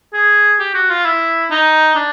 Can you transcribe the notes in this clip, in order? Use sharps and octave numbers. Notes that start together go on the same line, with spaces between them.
G#4
G4
F#4
F4
E4
D#4
D4